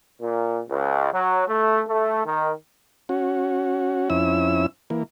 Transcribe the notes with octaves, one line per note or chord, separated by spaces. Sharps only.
A#2
C#2
F#3
A3
A3
D#3
C#4 F#4
F2 C#4 E4 E6
E3 A#3